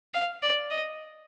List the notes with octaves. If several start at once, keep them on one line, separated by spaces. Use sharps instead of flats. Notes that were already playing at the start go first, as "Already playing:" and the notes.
F5
D5
D#5